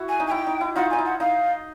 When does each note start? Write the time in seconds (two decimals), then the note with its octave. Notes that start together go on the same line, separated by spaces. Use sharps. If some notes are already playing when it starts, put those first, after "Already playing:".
Already playing: E4 F#4
0.09 G#5
0.20 D#4
0.27 G#5
0.31 E4 G5
0.47 D#4
0.61 E4
0.76 D#4 F4 F#5
0.90 D#4 G#5
0.98 E4
1.05 F#5
1.20 D#4 F5